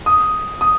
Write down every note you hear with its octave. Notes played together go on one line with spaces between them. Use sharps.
D#6
D#6